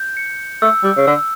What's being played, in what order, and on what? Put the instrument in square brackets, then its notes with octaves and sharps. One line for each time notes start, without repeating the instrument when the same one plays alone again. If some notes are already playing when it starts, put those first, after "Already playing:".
Already playing: [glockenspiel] G6
C#7
[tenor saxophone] A3 [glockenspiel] E6
[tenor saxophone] G3
C#3
[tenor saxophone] D3 [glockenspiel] E6